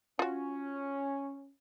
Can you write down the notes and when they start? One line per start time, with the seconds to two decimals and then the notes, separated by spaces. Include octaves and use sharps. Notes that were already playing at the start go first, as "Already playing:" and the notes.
0.19 C#4 F4 F#4